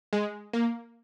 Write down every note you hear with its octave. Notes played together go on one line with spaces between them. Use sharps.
G#3
A#3